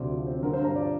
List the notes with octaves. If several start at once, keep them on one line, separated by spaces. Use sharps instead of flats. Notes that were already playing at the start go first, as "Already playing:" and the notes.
Already playing: D2 C3 C4 D5
F3
C4
D3 A#4
C5
G2
A#5
F3 D5